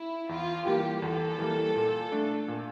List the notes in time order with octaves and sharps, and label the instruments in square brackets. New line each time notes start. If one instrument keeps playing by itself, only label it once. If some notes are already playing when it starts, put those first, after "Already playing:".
Already playing: [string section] E4
[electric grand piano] E2 [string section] F4
[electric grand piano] E3 G3 A#3 [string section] G4
[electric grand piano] E2 [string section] A4
[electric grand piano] E3 G3 A#3
A#2
A3 D4
A#2